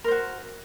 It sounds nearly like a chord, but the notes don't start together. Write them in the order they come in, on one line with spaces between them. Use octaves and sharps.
A#4 C5 F#4